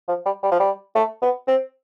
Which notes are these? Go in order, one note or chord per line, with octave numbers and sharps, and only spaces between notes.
F3
G3
G3
F3
G3
A3
B3
C4